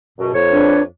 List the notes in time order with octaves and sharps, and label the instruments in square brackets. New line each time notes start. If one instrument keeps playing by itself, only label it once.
[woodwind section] C#2 F#2 B2
F2 C#5
[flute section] D4 B4